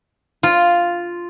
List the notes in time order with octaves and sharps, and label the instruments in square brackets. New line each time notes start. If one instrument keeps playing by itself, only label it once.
[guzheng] F4